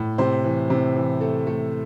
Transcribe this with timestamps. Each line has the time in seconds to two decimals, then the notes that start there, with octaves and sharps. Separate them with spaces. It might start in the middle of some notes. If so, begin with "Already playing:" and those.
Already playing: A2
0.18 C3 C5
0.44 E3
0.70 C3
0.95 E3
1.21 A3
1.47 A3